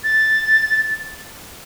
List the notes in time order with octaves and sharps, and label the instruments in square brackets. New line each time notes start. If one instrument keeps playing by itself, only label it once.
[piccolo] A6